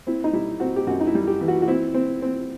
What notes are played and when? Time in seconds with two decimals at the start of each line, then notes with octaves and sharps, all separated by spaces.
0.07 C4 E4
0.24 D#4
0.33 G3 E4
0.60 C4 F#4
0.76 G4
0.87 F#2 F#4
1.00 D#4
1.07 E4
1.15 G3
1.27 G4
1.41 E3
1.48 F#4
1.62 F#4
1.68 C4 E4
1.94 C4
2.22 C4